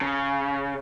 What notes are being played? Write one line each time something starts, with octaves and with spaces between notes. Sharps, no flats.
C#3